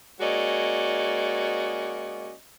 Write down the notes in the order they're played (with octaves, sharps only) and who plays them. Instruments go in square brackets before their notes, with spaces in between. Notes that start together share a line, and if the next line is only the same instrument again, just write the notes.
[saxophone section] G#3 A#3 C#4 F#4 D5 D#5